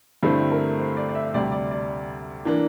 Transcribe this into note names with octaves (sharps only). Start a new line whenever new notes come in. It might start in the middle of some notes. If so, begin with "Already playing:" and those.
G2 D3 A3 C4 E4 A4
A#4
C5
D5
D5
E5
D2 C3 G3 D5
D5
D5
E3 A#3 D4